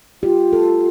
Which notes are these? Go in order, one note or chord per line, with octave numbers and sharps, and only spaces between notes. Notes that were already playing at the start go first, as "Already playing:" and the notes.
F4 G4
A4